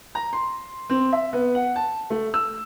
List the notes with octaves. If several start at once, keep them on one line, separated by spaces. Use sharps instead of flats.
A#5
C6
C4
E5
B3
F#5
A5
A3
E6